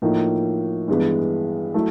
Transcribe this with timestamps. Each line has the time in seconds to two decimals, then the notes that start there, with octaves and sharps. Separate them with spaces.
0.02 A2 F3 A#3 D#4
0.88 G2 E3 G#3 B3
1.74 F#3 A3 E4